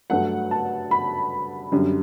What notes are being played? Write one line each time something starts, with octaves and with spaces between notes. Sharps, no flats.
G2 F#3 A3 F#5
A5
B5
F#2 D3 G3